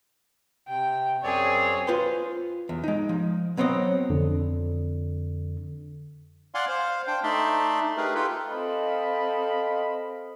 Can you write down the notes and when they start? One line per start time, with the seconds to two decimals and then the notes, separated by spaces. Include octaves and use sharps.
0.68 C3 G5
1.23 F#2 C4 G#4 C#5 D5
1.87 F4 B4 C5 G#5 C6
2.69 E2
2.84 G#3 D#4
3.09 F3
3.57 F#3 B3 C4 C#5 D#5
4.10 F2 D3
6.55 D5 F5 F#5 G#5 C6
6.68 C5 F5
7.07 D4 C5 G5
7.24 A3 D4 D#4 D5 E5 C6
7.97 A3 D#4 G4 G#4 A#4 B4
8.15 F4 G4 A4 B4
8.49 C4 A4 D#5 F5 B5